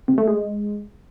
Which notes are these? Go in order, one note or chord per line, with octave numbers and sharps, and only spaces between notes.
C3
A3
G#3